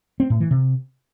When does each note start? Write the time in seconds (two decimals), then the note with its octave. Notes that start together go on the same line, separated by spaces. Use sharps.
0.20 C4
0.30 A2
0.40 E3
0.51 C3